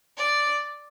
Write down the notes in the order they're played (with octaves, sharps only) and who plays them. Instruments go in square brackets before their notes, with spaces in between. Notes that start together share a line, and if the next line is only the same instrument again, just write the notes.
[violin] D5